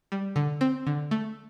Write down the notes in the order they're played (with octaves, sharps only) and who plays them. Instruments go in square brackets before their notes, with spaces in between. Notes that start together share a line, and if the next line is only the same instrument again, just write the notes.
[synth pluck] G3
D3
C4
D3
A3